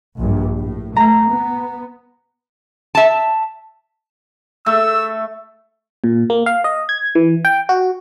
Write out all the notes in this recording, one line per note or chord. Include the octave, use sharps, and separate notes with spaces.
A#1 G2
A2
A3 A#5
B3
E5 A5
A3 E6
A#2
A#3
F5
D#5
G#6
E3
G5
F#4